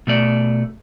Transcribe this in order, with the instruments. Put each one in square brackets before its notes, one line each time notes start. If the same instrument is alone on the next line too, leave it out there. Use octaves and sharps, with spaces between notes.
[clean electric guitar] B2 A3 D5